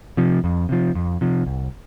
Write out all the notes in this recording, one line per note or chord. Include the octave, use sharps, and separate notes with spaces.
C3 F3
F2
C3 F3
F2
C3 F3
C2